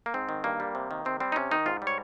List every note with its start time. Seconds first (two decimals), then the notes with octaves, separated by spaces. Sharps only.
0.06 A#3
0.14 G#2 C4
0.29 D#3
0.44 G2 A#3
0.60 G3
0.75 C3
0.91 D#3
1.05 C3 C4
1.20 G3 C4
1.32 D#4
1.36 C3 C#4
1.51 D#3 D#4
1.66 G#2 F4
1.82 G3
1.87 C#5